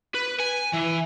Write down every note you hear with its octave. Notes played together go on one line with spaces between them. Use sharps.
B4
G#5
E3